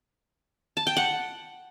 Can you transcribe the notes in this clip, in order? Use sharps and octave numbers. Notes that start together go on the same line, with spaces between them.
A5
G5
F#5